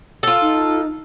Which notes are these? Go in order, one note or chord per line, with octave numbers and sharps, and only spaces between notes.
F4 A4
D#4